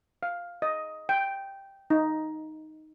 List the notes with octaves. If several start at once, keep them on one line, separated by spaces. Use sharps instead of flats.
F5
D#5
G5
D#4